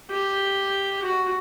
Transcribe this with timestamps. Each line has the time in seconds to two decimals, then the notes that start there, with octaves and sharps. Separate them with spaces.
0.11 G4
1.03 F#4